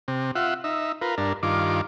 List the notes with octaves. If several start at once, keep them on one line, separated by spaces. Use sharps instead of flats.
C3
F4 E5 F#5
D#4 E5
F4 A#4 B4
G2 D4 A#4
G2 D#3 F4 D6